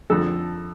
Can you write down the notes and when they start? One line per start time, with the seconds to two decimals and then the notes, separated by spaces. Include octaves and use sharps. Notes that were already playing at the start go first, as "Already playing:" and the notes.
0.10 F2 D3 F3 A4